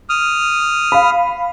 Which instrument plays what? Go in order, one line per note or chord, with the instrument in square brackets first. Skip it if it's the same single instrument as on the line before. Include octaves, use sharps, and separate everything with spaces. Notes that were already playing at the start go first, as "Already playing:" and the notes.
[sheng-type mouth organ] D#6 F6
[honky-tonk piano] F5 B5